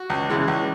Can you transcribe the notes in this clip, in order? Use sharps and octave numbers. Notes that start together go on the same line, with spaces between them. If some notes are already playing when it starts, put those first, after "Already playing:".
Already playing: F#4
C#2
C#3 E3 G#3
C#2